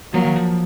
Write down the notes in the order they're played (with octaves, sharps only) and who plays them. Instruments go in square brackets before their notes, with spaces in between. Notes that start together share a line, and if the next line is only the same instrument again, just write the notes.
[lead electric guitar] F3 [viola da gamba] F#3 A#3
[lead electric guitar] D#3
F3